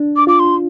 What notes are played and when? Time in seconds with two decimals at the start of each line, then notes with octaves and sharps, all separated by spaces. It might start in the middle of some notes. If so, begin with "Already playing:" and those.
Already playing: D4
0.16 D6
0.27 F4 D6
0.39 C6